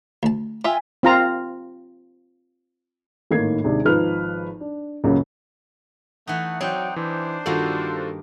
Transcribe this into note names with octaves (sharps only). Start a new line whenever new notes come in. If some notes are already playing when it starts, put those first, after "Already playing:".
D2 A5
F4 E5 G5 G#5
C4 F4 A#5
G#1 A2 D#3 A#3 G#6 C7
D#2 C3 G#3 D4
G#1 F3 D#4 B4 F6
D4
C#2 F#2 C#3 F#3 A#3
E3 A3 D#4 F#5
F#3 C4 D#4 C#5 D5 F#5 G5
E3 D4 C5
G2 D#3 A#3 F4 F#4 A4